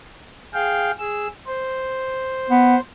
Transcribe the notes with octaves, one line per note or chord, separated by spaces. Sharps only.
G#4 F5 G5
G#4 E6
C5
B3